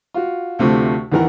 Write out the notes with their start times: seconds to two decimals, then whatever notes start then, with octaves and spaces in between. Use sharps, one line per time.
0.14 F4 F#4
0.59 D2 C3 F3 A3
1.12 E2 D#3 E3 A#4 F#5